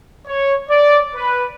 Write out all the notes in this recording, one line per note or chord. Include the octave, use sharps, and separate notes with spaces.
C#5
D5
B4